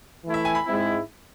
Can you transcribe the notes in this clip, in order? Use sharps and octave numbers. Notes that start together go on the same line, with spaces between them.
E3 A3 E4
E5
G#5
B5
G#2 G#3 C4 E4